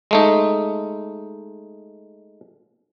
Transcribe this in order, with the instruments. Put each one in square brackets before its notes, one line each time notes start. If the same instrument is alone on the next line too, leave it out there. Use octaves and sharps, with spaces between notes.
[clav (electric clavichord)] G#3 A3 D#4